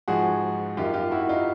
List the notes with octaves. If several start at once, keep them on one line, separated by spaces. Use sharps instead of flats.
G#2 F3 F#4 G#4
F#2 D#3 F4 G4
F4 G4
E4 F#4
D#4 F4